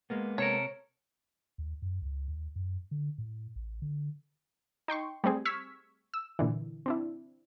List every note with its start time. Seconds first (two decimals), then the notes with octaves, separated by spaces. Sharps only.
0.10 G#3 A#3 B3
0.38 C3 A4 A#4 C#5
1.58 D#2
1.82 F#2
2.02 C#2
2.28 D#2
2.56 F#2
2.91 D3
3.18 A2
3.56 A1
3.82 D3
4.88 D#4 G5 C6 C#6
5.24 G3 A3 C4 G#4
5.45 C#6 E6 F6 G#6 B6
6.14 E6
6.39 A#2 D3 E3
6.86 C4 D4 E4